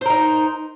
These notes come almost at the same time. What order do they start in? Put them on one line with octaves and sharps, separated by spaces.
C5 A#4 D#4